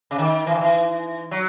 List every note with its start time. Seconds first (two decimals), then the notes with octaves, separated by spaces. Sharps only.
0.11 C#3
0.18 D#3
0.46 E3
0.54 D#3
0.61 E3
1.31 F#3